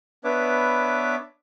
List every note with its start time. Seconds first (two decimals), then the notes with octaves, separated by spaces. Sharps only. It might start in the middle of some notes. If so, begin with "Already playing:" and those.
0.24 B3 D4 B4 C#5 E5 D6